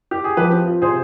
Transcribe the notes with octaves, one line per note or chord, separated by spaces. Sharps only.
G4
G#4
F3 G4 B4
C4
F4
C3 G#4 C5